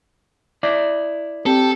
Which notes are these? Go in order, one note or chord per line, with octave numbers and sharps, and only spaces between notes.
E4 D5
C4 G4 A4